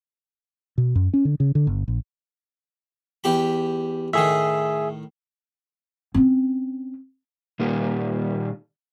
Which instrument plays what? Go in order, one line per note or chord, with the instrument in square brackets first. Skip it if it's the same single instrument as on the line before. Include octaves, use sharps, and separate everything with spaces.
[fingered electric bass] B2
F#2
C#4
D3
C#3
D3
G1
A#1
[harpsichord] E2 G4 B5
[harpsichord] A2 D#3 [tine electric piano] G#4 E5
[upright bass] C4 C#4
[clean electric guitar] A#2 D#3 G3 A#3